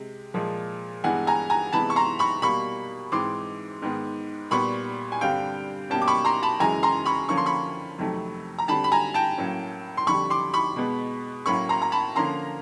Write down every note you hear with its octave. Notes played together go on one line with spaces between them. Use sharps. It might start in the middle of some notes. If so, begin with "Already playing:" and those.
Already playing: C3 G#3
A#2 F3 G#3
G2 E3 G#3 B3 F#5 G#5
G#5 A#5
G#5 A#5
C3 E3 G#3 B3 A5 B5
C#6
A#5 C6
B5 C#6
B2 G3 A#3 B5 C#6
G#2 E3 G#3 C4 C6 D6
G#2 D#3 G#3 B3
A#2 G3 B3 B5 C#6
G#5
G2 D3 G3 C4 F5 G5
B2 G3 A#3 C#4 G5 A5
D6
B5 C#6
A#5 C6
A5 B5
F#2 C#3 E3 G#3 G#5 A#5
A#5 C6
B5 C#6
D3 F3 A#3 C#4 C#6
C6
B5 C#6
F2 C3 D#3 F#3 A3
A#5
D3 G3 C4 A5 B5
B5
G#5 A#5
G5 A5
A2 F#3 A#3 C#4
C6
F2 D3 G3 B5 C#6
C6 D6
B5 C#6
B2 G#3 B3
A2 F#3 A#3 C#4 B5 C#6
A#5 C6
A#5
A5 B5
D3 F3 A#3 C#4 A#5 C6